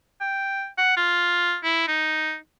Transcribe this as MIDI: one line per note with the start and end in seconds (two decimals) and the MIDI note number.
0.21 0.66 79
0.78 0.96 78
0.97 1.56 65
1.64 1.87 64
1.88 2.35 63